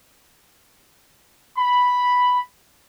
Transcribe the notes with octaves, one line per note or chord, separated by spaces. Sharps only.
B5